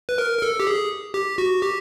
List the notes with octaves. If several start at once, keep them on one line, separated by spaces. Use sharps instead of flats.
B4
A#4
A#4
A4
G4
G#4
G4
F#4
G4